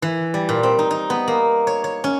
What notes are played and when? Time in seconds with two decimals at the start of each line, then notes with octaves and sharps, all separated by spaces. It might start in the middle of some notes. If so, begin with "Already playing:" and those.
0.02 E3
0.34 G3
0.49 A#2
0.63 C4
0.79 D#4
0.91 D#4
1.10 B3
1.28 A#3
1.67 C#5
1.84 C#5
2.04 C#4